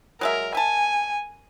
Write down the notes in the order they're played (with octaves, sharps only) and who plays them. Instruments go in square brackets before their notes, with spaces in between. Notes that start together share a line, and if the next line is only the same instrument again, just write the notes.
[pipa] F#3 G#3 E5 [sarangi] A#4
[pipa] E5 A5 [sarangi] G#5